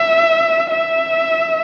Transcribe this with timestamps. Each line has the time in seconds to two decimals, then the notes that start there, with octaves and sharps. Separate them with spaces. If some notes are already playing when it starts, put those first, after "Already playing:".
Already playing: E5
0.71 E5